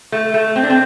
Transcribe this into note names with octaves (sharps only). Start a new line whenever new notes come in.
A3
A3
C4
D4
C4